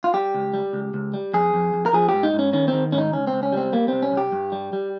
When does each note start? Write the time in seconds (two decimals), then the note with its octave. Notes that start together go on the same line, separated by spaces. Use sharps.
0.04 F4
0.14 G3 G4
0.34 C#2
0.54 G3
0.73 C#2
0.94 C#2
1.14 G3
1.34 F2 G#4
1.54 F2
1.74 F2
1.86 A#4
1.93 F3 G#4
2.09 G#2 G4
2.23 D#4
2.33 G#2
2.39 C#4
2.53 D#3 C#4
2.68 C4
2.73 D#3
2.92 G#2 C#4
2.98 D#4
3.12 C#2 C#4
3.27 C4
3.33 C#2
3.43 C#4
3.52 G3 C4
3.73 G3 A#3
3.88 C2 C4
4.02 C#4
4.12 C2
4.17 G4
4.32 G2
4.52 G3
4.73 G3